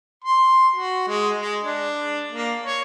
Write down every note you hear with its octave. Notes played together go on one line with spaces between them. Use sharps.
C6
F#4
G#3
G#3
D4
A#3
C#5